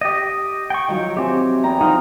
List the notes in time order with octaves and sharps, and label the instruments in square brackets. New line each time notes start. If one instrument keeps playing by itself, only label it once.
[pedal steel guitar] G4 D#5
G5 C#6
[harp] D#3 F3 F#3
[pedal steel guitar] C4 G4 [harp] E5 G#5
[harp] E2 G5 A#5
[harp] F3 F#5 F6 [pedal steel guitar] C4 D#4